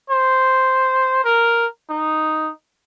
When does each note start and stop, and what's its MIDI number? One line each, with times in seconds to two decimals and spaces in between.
0.10 1.20 72
1.24 1.66 70
1.90 2.50 63